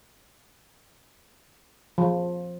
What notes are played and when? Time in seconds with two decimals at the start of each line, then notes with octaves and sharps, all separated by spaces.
1.98 F3